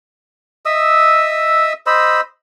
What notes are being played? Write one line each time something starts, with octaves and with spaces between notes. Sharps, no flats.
D#5 E5 D#6 E6
C5 D#5 B5 E6